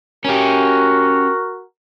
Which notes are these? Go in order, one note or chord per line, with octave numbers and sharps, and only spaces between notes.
C#4 F#4 G4 A#4